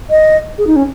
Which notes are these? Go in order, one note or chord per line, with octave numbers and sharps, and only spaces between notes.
D#5
G#4
D#4
C#4